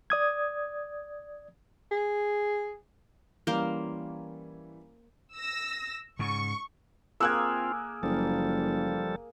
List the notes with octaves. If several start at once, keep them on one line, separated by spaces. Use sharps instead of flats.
D5 D#6 G#6
G#4
E3 G3 A#3 C#4 C5
E6 A#6
G#2 C#3 C#6
A#3 C4 F4 G#4 A#4 E6 F#6 G#6
F#1 F3 G3 A4